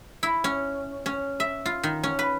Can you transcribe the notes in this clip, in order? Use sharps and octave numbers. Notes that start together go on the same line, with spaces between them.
E4
C#4
C#4
E5
F4
D#3
C#4
B4